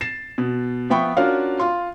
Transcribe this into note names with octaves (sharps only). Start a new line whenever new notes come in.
A6 C7 E7
B2
F3 B3 E5 G5 B5 C#6
C#4 D4 F4 F#4 A#4 F5
F4 C6